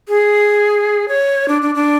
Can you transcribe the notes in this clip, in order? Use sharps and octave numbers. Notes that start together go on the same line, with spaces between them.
G#4
C#5
D4
D4
D4